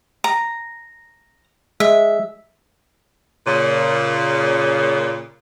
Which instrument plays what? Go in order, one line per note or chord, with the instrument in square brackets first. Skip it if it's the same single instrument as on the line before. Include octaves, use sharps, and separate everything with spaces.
[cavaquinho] A#5
[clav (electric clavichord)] G#3 [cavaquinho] E5
[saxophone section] A#2 C#3